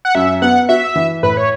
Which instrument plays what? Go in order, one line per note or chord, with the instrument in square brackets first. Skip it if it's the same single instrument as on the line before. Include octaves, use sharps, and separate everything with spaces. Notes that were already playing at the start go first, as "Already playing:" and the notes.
[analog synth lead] F#5
[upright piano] F#2 [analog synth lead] E5
[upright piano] B3 [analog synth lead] F#5
[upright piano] F#4 [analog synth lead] E5
[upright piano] E3
[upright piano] A2 [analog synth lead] B4
[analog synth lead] C#5